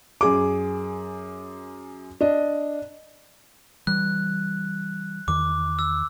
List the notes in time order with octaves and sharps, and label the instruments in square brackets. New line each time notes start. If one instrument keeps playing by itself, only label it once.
[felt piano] F#2 G#4 D6
D4 D#5
[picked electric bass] E3 G3 [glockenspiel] F#6
[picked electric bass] E2 D#3 [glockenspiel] D6
[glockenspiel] E6